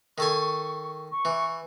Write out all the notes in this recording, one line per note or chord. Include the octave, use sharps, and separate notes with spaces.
D#3 A4 G#5 C#6
C#6
E3